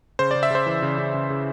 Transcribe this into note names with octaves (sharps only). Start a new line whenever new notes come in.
C#3 C5
D5
C#3
E5
C#3 C5
E3
C#3
C#3
C#3
C#3